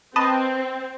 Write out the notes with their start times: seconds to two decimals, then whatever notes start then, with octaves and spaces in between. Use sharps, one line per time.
0.16 C4 B4 D#5 A5